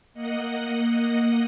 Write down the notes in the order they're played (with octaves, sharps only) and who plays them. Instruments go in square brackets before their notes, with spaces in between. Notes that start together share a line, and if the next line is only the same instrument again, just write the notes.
[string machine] A#3 D#5 F#5